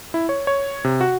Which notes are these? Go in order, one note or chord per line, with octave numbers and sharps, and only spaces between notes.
E4
C#5
C#5
C3
F#4